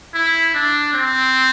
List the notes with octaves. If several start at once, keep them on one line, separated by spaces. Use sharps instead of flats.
E4
D4
C4